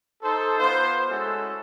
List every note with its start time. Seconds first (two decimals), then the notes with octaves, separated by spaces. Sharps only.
0.23 D#4 A4 C5
0.58 B3 F4 B4 C5
1.09 G#3 A3 C#4 E4 F#4 A4